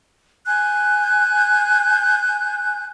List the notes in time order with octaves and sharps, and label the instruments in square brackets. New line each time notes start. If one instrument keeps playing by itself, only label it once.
[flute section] G#5 F#6 G6